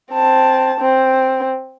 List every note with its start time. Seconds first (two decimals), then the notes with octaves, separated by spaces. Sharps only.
0.12 C4 A5
0.80 C4